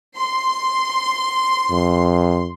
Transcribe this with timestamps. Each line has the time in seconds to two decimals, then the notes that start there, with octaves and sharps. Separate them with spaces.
0.17 C6
1.71 F2